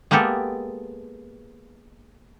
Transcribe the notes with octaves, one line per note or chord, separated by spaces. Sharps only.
G#3 A#3 B3 G4 A4